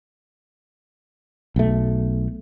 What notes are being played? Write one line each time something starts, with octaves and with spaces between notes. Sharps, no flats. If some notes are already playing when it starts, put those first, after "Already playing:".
B1 A3